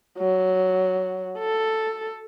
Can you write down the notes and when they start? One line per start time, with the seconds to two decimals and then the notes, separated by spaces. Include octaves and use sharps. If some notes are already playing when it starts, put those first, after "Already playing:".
0.18 F#3
1.39 A4